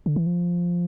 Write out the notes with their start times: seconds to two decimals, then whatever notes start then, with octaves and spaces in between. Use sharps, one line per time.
0.06 D3
0.16 E3
0.26 F3